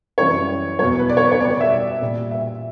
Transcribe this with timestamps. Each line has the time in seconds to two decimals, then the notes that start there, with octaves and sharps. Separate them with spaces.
0.18 F#2 E3 G3 C#5
0.79 E2 B2 F#3 C#5
0.99 B4
1.09 D5
1.17 C#5
1.24 B4
1.32 C#5
1.40 B2 D5
1.44 G3
1.50 D5
1.61 E5
1.70 D5
2.01 A#2 G3
2.31 E5